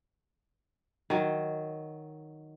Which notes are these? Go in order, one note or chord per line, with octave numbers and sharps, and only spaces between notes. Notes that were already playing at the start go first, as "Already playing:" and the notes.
D#3 F#3